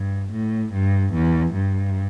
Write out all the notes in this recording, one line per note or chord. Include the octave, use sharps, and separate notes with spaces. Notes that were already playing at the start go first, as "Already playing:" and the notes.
Already playing: G2
A2
G2
E2
G2